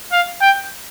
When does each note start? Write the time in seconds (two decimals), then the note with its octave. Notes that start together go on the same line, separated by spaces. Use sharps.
0.12 F5
0.42 G5